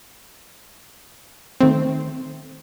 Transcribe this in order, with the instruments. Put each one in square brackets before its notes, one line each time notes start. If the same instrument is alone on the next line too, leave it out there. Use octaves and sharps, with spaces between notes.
[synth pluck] D#3 A3 C4